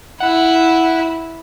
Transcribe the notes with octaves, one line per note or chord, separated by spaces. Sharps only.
E4 F#5